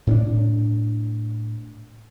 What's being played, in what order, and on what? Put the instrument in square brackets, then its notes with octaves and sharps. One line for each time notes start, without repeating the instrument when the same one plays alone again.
[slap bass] A2 C#4 D4